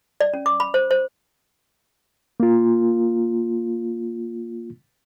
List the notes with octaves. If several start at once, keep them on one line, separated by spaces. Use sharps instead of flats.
D5
C#4
D6
B5
C5
C5
A#3 F4